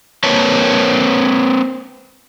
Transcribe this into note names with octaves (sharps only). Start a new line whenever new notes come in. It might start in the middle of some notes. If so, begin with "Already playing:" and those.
A#3 C4 B4 C#5 A5